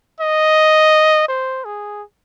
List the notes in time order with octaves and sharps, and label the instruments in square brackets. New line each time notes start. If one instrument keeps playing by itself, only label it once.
[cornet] D#5
C5
G#4